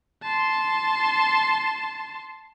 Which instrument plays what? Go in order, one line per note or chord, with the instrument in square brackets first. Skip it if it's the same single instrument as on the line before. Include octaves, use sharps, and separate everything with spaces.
[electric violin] A5 C6